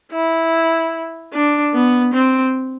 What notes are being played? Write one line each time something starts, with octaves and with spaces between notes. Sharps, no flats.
E4
D4
B3
C4